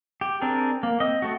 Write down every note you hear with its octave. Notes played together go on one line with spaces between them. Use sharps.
G4
C4 D4 G#4 A#4
A#3
C4 D#5
A3 F#4